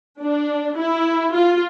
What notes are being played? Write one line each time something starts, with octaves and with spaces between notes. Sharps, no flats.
D4
E4
F4